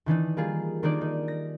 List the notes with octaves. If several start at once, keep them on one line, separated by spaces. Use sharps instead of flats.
D#3 E3 D4 D#4
G3 A#3 F4 G#4
D#3 A#3 D4 D#4 A#4 D5
D#4
A#6